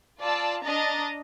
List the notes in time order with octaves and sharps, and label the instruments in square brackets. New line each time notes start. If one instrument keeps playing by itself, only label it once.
[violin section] F4 D5 A5 E6
D4 D#5 A#5 A6